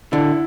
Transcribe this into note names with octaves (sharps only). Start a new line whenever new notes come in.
D3 E4